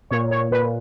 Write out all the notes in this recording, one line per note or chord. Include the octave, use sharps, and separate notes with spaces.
A#2 C#5
C#5
A#2 B4